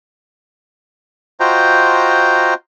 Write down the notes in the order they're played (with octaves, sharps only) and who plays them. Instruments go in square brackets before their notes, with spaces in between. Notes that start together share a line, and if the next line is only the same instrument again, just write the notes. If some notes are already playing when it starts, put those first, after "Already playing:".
[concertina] F4 F#4 C5 D#5 G5 A#5